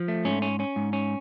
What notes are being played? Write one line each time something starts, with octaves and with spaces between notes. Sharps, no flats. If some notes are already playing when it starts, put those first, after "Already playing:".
Already playing: F3
A3
G#2 C#4
C#4
C#4
G#2
C#4